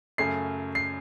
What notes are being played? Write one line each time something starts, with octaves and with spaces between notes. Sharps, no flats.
F#2 C#3 A3 C#4 C7
C7